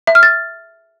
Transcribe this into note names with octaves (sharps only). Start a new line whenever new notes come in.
E5
F6
A6